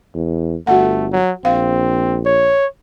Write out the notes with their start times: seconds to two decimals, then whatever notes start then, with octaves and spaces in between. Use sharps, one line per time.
0.15 E2
0.67 G1 A3 F#4 F#5
1.12 F#3
1.45 A#1 C4 F5
2.26 C#5